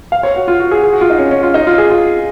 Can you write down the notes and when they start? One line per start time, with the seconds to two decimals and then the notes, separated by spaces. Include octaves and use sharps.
0.12 F5
0.23 C#5
0.36 F#4
0.48 F4
0.60 F#4
0.71 G#4
0.83 G#4
0.93 F#4
1.01 F4
1.10 D#4
1.19 C#4
1.31 C#4
1.43 F4
1.54 D#4
1.67 F4
1.78 G#4
1.90 F4